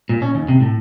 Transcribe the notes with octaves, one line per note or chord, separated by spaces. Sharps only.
A#2
C#4
D#2
C3
A2